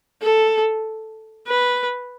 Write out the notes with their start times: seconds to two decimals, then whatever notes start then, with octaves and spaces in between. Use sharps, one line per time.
0.22 A4
1.47 B4